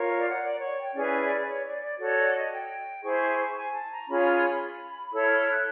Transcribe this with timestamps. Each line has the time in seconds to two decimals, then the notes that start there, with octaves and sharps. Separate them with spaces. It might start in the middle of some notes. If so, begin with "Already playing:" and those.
Already playing: F4 A#4 C#5
0.16 D5
0.29 F#5
0.42 D5
0.59 C#5
0.77 G5
0.94 C#4 E4 G#4 B4 D5
1.21 D5
1.47 C#5
1.65 D5
1.82 D5
1.99 F#4 A4 C#5 D5
2.17 D5
2.34 D#5
2.51 G5
3.03 E4 G#4 C5 C#6
3.20 C#6
3.39 C#6
3.55 G#5
3.73 A5
3.91 A#5
4.08 C#4 F4 G#4 C#5 B5
4.25 B5
4.43 B5
5.13 E4 A4 C#5 E6
5.26 F6
5.39 F6
5.51 F#6